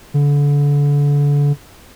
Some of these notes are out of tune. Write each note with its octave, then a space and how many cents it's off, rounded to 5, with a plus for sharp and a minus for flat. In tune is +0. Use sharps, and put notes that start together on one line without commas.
D3 -30